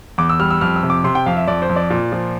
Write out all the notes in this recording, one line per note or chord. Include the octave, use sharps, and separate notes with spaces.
E2 D6
E6
G3 F6
E6
F2 F6
E6
C3
D6
C3 C6
G5
F2 F5
E5
F2 D5
C5
F2
D5
A#2
F3